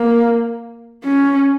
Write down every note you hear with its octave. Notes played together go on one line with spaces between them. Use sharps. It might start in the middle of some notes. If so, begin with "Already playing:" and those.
Already playing: A#3
C#4